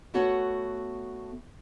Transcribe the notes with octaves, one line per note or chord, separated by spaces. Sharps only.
A3 B3 F#4 A4 C#5 F#5